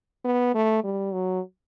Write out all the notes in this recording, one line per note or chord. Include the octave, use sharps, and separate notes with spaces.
B3
A3
G3
F#3